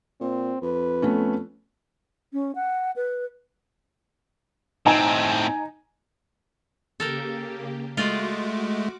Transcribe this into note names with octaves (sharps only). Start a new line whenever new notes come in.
A#2 C4
F2 B4
A3 B3 C#4
C#4
F#5
B4
A2 C4 D#4 G#5
C#3 A#3 G4 A4 A#4 G5
G#3 A3 F4 F#4 D5 D#5 D6